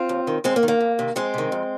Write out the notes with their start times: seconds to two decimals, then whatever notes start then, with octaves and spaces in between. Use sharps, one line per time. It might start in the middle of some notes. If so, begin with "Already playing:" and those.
Already playing: C4 F4
0.09 D#2
0.27 D#3
0.44 D#2 G#3 C4
0.56 A#3
0.63 D#3
0.68 A#3
0.80 F2
0.99 C3 D#3
1.16 F2 G#3 C4
1.34 C3 D#3
1.52 F2